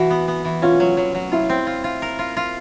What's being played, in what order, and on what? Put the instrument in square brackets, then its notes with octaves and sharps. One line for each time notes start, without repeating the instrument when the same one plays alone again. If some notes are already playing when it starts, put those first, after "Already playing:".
Already playing: [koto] E3 [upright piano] F#4
[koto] B3
B3
E3
[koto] C#4 [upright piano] F4
[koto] F#3
F#3
F#3
[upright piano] E4 [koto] F4
[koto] C4
F4
F4
A#4
F4
F4